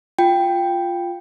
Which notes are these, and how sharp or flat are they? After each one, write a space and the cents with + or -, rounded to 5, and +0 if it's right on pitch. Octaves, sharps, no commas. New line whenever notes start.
F4 +0 G5 +0